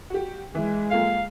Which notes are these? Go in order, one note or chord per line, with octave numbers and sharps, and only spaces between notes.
F#4 G4
E3 G#3
A#3 F4 A4 F5